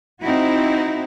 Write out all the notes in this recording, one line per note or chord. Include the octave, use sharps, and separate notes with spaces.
C4 D#4 E4 F#4